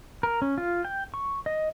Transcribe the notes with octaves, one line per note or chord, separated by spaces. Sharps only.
A#4
C#4
F4
G5
C#6
D#5